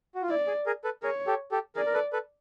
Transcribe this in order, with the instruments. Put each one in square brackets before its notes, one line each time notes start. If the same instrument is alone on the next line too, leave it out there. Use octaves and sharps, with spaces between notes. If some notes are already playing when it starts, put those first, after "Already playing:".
[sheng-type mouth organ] F#4
F4
[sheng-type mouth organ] E4 [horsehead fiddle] D5
[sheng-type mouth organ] G#4
G#4 A#4
A4 B4
[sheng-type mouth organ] G#4 A#4 [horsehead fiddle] C#5
[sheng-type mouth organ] G4 A4
G4 A4
[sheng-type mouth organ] G#4 A#4 [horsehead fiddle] D5
[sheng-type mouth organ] A#4
A4 B4
A4 B4